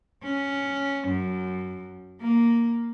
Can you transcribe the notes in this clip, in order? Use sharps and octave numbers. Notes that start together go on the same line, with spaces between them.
C#4
F#2
A#3